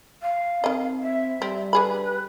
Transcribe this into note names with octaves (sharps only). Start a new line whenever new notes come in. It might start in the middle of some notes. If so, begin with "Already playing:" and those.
F5
D#3 C4 D#5
E5
G3 C4
D3 G#4 B4 B5